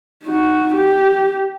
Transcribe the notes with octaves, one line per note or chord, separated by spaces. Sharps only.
D#4 F#4
G4